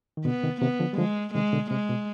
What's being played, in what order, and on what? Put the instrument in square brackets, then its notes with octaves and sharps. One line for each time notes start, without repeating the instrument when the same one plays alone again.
[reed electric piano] D#3
[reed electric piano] B2 D3 [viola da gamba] B3
[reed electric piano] C3 D#3
[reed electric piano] C3 D#3 [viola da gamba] B3
[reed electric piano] D3 F3
G3
[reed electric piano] D3 F3 [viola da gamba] G#3
[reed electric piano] C3 D#3 [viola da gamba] G#3
[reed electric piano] B2 D3
[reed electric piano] C3 [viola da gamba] G#3
[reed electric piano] B2